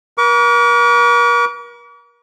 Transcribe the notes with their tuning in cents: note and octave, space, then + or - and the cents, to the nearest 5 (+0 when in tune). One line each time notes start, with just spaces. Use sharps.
A#4 +40 D6 -45